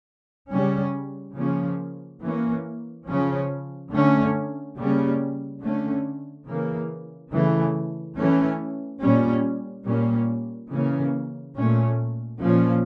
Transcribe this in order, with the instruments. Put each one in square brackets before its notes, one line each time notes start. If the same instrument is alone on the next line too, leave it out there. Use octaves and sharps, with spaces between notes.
[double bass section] C#3 G3 C#4
C#3 F3 A#3 C#4
E3 A#3 C#4
C#3 F3 C#4
D3 A3 C#4
C#3 G3 A#3 C#4
D3 A3 C#4
C#3 E3 A#3
C#3 E3 A3
E3 A3 C#4
A#2 G3 C#4
A#2 G3 A#3 C#4
C#3 E3 A#3 C#4
A#2 A3 C#4
A#2 F3 C#4